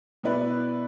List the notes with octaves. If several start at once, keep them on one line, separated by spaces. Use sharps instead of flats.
B2 B3 E4 B4 D5